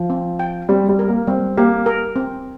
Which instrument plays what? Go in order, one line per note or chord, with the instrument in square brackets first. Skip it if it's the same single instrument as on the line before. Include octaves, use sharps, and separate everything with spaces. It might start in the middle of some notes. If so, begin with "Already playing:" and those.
Already playing: [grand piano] F3
[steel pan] C4
G5
[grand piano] G3 [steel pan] C4
[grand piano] G3
[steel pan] A#4
[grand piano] A#3
[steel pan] G3 [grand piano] C4
[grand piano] A#3 [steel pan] G4
[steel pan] A#4
C4